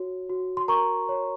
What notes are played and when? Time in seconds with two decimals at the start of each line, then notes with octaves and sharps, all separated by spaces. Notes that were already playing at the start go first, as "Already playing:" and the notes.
Already playing: F#4 C#5
0.29 F#4
0.57 C6
0.68 A#4 A#5 C#6
1.09 C#5